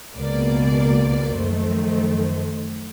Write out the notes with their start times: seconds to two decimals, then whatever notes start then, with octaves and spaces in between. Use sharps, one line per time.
0.16 C#2 B2 A#3 D5
1.34 F#2 D#3 F3 A3 C5